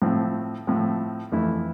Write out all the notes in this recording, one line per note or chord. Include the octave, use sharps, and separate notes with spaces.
A2 F3 C4
A2 F3 C4
F2 E3 A3 E4